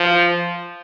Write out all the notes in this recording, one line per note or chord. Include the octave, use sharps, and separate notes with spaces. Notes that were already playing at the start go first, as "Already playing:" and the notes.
Already playing: F3